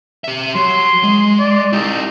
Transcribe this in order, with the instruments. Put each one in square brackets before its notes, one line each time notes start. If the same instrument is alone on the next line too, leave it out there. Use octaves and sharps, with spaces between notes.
[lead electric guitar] G4 E5
[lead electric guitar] F#3 [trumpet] C6
[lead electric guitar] G#3
[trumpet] D5
[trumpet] D#4 [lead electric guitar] E4 G4